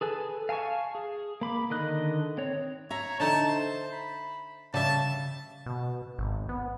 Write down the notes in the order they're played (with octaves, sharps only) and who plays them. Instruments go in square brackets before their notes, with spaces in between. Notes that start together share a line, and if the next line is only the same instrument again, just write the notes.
[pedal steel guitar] G#4 A4 B4 G#5
F5 G#5 A5 C#6
G#4
A#3 B5 D6
D3 D#3 D#5 F#6
C4 C#5
[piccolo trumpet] C#5 [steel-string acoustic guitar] E5 A#5
[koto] D3 D#4 A4 [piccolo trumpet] A5
[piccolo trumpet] C5
B5
[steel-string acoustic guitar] C#3 [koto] G3 E5 [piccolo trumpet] A5
[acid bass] B2
G#1
B3